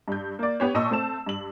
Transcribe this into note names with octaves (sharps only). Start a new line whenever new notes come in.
G2 G6
A#3 D5
B3 G4 C#5
A#2 D#5 A5 C#6 E6
A3 C4 A5 E7
G2 F#7